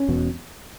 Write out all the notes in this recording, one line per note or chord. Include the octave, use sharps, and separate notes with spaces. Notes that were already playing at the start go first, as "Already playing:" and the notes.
Already playing: C#4
E1 E2 B2